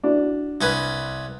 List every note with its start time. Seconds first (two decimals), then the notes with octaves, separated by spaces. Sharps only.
0.04 D4 E4 F#4
0.61 C2 C#4 B4